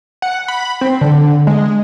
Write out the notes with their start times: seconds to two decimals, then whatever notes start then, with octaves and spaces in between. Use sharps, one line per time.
0.22 F#5
0.48 B5
0.81 C4
1.01 D3
1.47 G#3